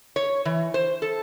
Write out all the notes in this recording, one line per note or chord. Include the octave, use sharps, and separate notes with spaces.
C#5
E3
C5
A4